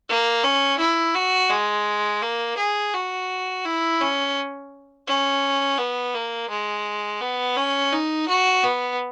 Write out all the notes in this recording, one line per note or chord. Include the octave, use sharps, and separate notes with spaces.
A#3
C#4
E4
F#4
G#3
A#3
G#4
F#4
E4
C#4
C#4
B3
A#3
G#3
B3
C#4
D#4
F#4
B3